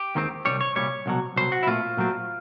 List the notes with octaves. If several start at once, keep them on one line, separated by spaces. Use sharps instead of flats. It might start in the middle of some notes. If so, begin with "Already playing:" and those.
Already playing: G4
D#2 D#3 G#3 C4
C2 A#2 G3 C#5
C#5
C2 A#2 G3 C#5
C2 B2 F#3
C2 B2 F#3 C5
F#4
E4
A#2 F#3 A3 C4 F4
A#2 F#3 A3 C4